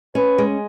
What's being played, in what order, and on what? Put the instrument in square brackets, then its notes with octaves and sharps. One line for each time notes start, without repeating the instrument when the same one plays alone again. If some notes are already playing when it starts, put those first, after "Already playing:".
[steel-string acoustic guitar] C#4 [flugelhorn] B4
[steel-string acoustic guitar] G#3